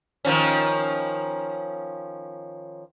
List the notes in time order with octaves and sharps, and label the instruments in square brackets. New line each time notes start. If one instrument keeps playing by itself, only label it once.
[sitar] D#3 F3 C#4